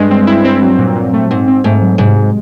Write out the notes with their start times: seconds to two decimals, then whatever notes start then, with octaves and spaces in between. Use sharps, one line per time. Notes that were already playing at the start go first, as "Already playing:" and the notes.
Already playing: G2 G#3
0.11 C4
0.27 E4
0.44 C4
0.61 F#3
0.78 A#2
0.96 A#2
1.13 A3
1.30 G#2 C4
1.48 C4
1.64 G#2 A3
1.82 F#3
1.98 G#2 C3
2.16 G#3